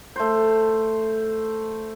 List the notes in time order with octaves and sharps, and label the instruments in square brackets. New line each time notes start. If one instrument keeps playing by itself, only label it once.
[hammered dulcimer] A3 C5